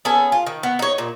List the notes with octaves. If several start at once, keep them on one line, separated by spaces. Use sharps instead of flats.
B3 C#4 G#4 A4
F4
D#3
B3
D#4 C#5
A#2